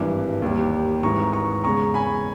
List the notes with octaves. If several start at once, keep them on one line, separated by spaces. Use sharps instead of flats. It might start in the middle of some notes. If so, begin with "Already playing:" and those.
Already playing: G#1 G2 E3
D#2 D#3 G3
G#1 G#2 E3 A#5 C#6
A#5 C#6
E2 C#3 G#3 A#5 C#6
G#5 B5